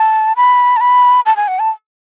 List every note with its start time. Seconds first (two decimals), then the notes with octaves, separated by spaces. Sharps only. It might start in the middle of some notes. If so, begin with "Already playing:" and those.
Already playing: A5
0.36 B5
0.77 A5
0.81 B5
1.26 A5
1.37 G#5
1.48 F#5
1.59 A5